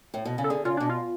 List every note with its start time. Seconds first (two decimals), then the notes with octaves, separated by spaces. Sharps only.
0.14 A2
0.25 B2
0.38 C#3
0.44 A4
0.50 D3 G#4
0.65 C#3 F4
0.77 B2 D4
0.89 F4